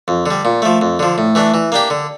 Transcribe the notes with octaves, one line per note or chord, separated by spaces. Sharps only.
F2
D3 G3
A#2
F3 A3
F2
D3 F3
A2
E3 A3 D4
E3
A#3 D4 G4
D3